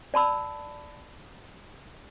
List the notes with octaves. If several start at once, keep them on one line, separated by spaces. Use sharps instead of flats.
D5 A5 B5 E6